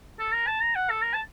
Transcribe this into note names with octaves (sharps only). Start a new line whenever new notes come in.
A4
A#4
A5
A#5
F#5
A4
A#4
A5